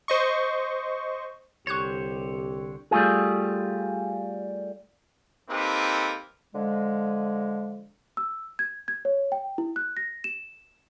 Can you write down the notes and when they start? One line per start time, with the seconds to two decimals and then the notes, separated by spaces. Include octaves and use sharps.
0.08 C5 D#5 C#6
1.67 C2 D3 G4 C5 C#5 C#6 F#6 G#6
2.91 G3 A3 F4 G#4
5.50 A#3 C4 D#4 G4 A4 B4
6.54 D3 F3 G#3
8.17 E6
8.59 G#6
8.88 G#6
9.05 C#5
9.32 G5
9.58 E4
9.76 F#6
9.97 A#6
10.24 E7